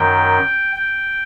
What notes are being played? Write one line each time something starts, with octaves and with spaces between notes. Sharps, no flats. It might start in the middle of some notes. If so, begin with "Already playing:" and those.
Already playing: F#2 D#3 G5
G5